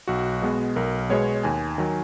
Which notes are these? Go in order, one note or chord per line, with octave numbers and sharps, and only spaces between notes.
B1 F#4
B2 G#3 B3
B1 A#4
B2 G#3 B3 C#5
D#2 G#5
D#3 F#3